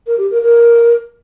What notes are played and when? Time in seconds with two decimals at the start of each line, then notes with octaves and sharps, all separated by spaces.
0.07 A#4
0.18 G4
0.30 A#4
0.42 A#4